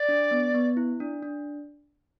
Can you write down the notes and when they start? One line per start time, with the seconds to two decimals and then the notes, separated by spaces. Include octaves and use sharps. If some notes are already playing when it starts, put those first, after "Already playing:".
Already playing: D5
0.09 D4
0.31 B3
0.54 B3
0.77 E4
1.00 D4
1.23 D4